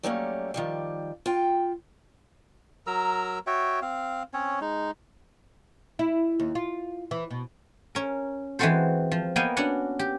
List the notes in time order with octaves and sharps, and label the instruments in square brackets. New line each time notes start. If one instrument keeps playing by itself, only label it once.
[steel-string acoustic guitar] F#3 G3 A3 A#3 C4 C#4
D#3 F3 G3
F4 G5
[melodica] F#3 A#4 A#5 E6
F#4 C#5 E5 G5
C4 F5
C4 C#4 C#5
G#3 D#4
[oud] E4
D#2
F4
E3
B2
[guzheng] C#4 A#4
E3 G#3 C4 F#4 A4 C5
F3
A#3 B3 D#5 F5 G5 G#5
C#4 D4 F#4 F#5
G4